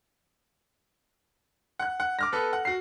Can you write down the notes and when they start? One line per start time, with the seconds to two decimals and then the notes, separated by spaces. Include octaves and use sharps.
1.79 F#5 F#6
2.00 F#5
2.19 D6 F6 A#6
2.32 B3 A4 B4
2.53 F#5
2.65 F#4 C7